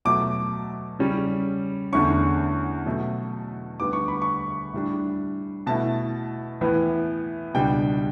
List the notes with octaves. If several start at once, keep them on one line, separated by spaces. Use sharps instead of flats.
B2 F#3 A3 D6
C#3 G3 C#4
E2 D3 A3 C#4 C#6
B2 F#3 A3
D2 D3 G3 B3 D6
C#6
B5
C#6
A2 G3 D4
B2 A3 E4 A5
A2 E3 B3
C#2 B2 G3 D4 G5